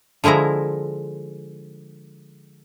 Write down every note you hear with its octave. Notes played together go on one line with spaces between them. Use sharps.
D3 F3 G#3 E4 A#5